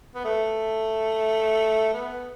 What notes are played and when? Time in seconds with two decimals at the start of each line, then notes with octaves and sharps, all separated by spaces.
0.15 B3
0.24 A3
1.94 B3